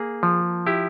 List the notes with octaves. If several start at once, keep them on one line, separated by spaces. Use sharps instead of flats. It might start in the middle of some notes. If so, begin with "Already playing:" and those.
Already playing: A#3 G#4
F3
E4 G4